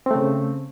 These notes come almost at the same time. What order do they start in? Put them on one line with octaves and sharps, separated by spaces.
C4 A3 C#3